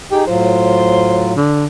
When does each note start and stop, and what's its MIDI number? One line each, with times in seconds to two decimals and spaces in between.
0.12 0.24 63
0.12 0.25 67
0.12 0.24 68
0.27 1.34 45
0.27 1.34 54
0.27 1.34 65
0.27 1.26 72
1.37 1.66 50